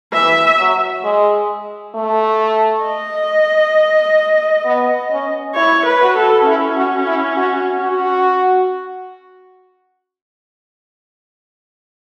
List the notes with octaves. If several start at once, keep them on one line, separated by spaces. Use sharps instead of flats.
E3 E5
F#3
G#3
A3
D#5
B3
C#4
E4 C#5
B4
F#4
A4
C#4 E4
F#4
E4
F#4
F#4